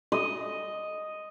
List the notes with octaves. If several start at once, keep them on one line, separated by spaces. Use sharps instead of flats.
D#5